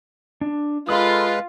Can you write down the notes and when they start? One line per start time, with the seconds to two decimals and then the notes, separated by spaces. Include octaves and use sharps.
0.41 D4
0.89 G#3 F4 A4 B4 B5 D#6